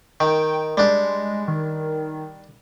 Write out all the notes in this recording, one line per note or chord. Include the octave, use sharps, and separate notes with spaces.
D#3 G5
G3 G#3 D4
D#3